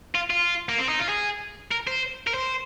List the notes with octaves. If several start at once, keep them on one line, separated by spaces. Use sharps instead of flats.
F4
F4
A#3
C4
D#4
F4
G#4
A#4
C5
A#4
C5